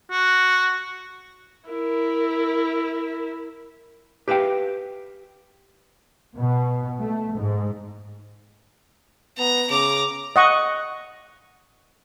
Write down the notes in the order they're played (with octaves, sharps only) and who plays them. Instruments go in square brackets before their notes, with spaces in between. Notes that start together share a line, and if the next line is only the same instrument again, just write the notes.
[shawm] F#4
[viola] E4 A#4
[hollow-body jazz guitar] G4 B4 E5 F5 G5
[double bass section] B2
A3
G#2
[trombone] B3 [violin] A#5
[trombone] C#3 [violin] A#5 D6
[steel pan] D#5 F#5 C#6